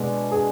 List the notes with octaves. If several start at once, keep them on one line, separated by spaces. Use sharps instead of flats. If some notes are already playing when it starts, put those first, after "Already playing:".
Already playing: B2 G#3 D4
G#4